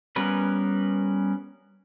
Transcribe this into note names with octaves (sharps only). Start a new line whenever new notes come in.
G3 B3 C#4 A#4 B4